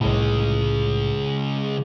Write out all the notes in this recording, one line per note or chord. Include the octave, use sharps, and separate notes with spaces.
C2 A2 C#3 G#3